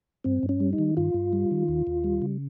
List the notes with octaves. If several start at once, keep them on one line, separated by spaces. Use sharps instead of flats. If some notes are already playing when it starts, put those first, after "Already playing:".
G2 C4
G2
C#4
G3
D#4
D#3
G2 F4
G2
G3
D#3
D#2
D#2
G3
C#3